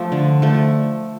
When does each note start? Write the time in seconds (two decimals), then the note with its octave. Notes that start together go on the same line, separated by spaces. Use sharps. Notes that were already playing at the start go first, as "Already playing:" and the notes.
Already playing: F3 A3
0.12 D3
0.42 F3 A3